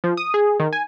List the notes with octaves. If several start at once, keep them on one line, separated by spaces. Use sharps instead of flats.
F3
D#6
G#4
D#3
G#5